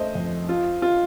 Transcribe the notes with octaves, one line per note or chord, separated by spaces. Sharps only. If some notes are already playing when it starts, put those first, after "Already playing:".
Already playing: A3 C5 D#5
F2
F4
F4